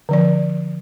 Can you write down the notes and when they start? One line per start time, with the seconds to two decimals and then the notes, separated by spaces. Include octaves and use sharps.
0.09 D3 F3 D5